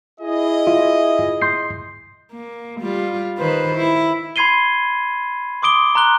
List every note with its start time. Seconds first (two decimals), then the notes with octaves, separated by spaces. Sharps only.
0.21 E4 G#4 D#5
0.67 F4 E5
1.42 C6 G6 C7
2.32 A#3
2.80 G3 F4
3.38 D#3 B4 C5
3.76 E4
4.36 B5 C6 G#6 C7 D#7 G7
5.62 C6 D6 D#6 D7 G7
5.95 A#5 C6 F#6 G7